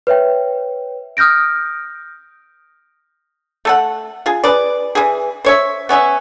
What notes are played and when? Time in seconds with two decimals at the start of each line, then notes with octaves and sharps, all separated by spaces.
0.07 B4 C#5 E5 G5
1.17 D#6 F6 G6 A#6 D7
3.65 A3 A4 F#5
4.26 F4 G#4
4.44 G#4 B4 D5
4.95 E3 G#4
5.45 C5 C#5 E5
5.89 B3 C#4 D#5 E5